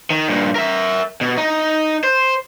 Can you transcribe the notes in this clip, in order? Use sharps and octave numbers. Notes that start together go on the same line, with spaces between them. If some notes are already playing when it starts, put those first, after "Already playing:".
D#3
G2 A#2
A#4 E5
B2
D#4
C5